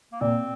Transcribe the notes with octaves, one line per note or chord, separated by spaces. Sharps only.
A#3
A#2 C4